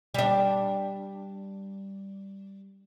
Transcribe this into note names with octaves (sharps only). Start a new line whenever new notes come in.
G3 D4